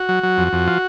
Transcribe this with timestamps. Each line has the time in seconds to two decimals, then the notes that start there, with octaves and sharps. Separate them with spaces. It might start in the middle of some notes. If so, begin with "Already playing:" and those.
Already playing: F#4
0.09 F#3
0.23 F#3
0.38 F2
0.53 F2
0.68 F3